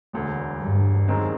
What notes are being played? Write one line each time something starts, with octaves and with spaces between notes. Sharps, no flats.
E1 D2 D3
G2
F#2 D#3 G#3 C4